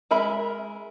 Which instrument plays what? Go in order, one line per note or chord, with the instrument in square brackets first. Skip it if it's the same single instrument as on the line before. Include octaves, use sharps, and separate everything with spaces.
[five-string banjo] G#3 A#4 E5 B5